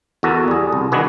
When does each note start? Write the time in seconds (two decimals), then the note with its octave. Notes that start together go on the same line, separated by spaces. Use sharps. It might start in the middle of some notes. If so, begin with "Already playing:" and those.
0.23 E2 F#4 A4 A#4
0.48 G3 G#4
0.72 C2
0.92 D#3 D4 F#4 G#4 B4